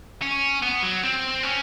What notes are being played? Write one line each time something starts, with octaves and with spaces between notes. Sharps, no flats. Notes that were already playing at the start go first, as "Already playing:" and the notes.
C#4
B3
F#3
C4
C#4